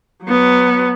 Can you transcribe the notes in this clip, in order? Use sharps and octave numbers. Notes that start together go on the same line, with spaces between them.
F#3 B3